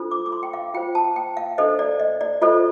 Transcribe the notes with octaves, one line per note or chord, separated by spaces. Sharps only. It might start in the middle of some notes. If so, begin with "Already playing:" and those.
Already playing: D4 F4 A4 C5
D6
D6
C6
G5
F5
F4 C5 G5
A5
G5
F5
D4 A4 C5 D#5
D5
D#5
D5
F4 A4 C5 D#5